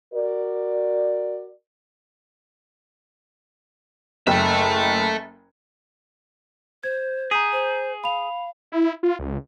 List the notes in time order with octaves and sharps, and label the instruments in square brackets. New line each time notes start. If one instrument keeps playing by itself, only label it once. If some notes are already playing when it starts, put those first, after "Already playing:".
[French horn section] F#4 A#4 D5
[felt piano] F#1 G5 [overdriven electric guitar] A4 E5
[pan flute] C5 [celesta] G#6
[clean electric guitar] G#4 [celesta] A#5 G6 B6
[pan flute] C5
[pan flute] F5 [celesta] B5 F7
[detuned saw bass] E4
F4
C#2